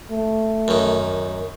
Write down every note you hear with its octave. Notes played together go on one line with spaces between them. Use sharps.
A3
F#2 D#3